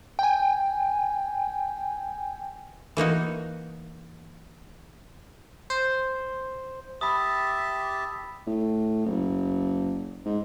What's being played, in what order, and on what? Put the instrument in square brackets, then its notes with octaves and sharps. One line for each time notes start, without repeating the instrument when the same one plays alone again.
[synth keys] G5 G#5
[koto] E3 A#3 D#4 F#4
[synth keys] C5
[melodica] G4 E5 A5 [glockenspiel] B5 D#6
[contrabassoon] A2
F#1
G#2